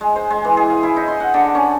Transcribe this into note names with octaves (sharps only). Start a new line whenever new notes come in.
G#3
C5
G#3
E3
G#4
F5
E4
D#4
C6
F#5
D3
C#4